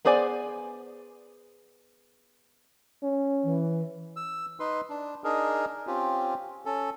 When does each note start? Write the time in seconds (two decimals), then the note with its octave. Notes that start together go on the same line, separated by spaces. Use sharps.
0.05 B3 G#4 C5 D5 G#5
3.03 C#4
3.44 E3
4.16 E6
4.60 D#4 B4 C6
4.89 D4
5.24 D4 D#4 G#4 A#4
5.87 C4 C#4 F4 G4
6.65 C#4 A4